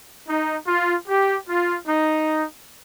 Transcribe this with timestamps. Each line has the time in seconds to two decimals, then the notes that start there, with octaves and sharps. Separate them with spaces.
0.28 D#4
0.67 F4
1.08 G4
1.48 F4
1.88 D#4